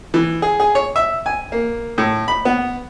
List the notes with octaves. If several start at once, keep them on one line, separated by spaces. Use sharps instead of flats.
E3
G#4
G#4
C#5
E5
G#5
A#3
A2
B5
B3